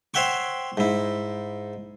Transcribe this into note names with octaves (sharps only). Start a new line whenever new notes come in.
C5 C#5 E5 F#5 G5 C#6
G#2 E4